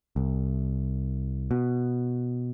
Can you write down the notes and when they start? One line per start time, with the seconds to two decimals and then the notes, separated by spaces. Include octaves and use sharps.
0.16 C2
1.51 B2